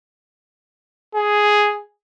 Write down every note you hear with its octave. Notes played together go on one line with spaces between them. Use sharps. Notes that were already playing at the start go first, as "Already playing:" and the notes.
G#4